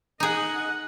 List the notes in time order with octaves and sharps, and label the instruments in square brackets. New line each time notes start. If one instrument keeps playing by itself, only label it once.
[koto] D#4 G#4 [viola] D#5 F#5